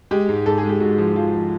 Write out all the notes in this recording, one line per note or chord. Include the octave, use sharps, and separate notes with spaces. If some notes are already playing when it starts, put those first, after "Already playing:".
G#3 G4
G#2
G#2 A4
G#4
G#3
G4
G#2 F#4
F3
F3 F4
F3